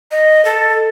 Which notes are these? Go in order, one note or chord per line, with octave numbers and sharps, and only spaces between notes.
D#5
A4